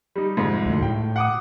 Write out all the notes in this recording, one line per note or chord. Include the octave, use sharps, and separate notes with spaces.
G3 D#4
C2 F2 G#2
D2
A2 G5
F#5 D6 D#6